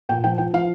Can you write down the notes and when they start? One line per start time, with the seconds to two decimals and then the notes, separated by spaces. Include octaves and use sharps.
0.09 A#2 G5
0.24 F3 G5
0.38 F3 G5
0.53 F3 F5